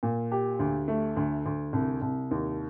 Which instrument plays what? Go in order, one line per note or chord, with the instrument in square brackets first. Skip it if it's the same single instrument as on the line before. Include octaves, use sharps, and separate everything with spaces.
[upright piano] A#2
G4
D2
A3
D2
D2
C2
C2
D#2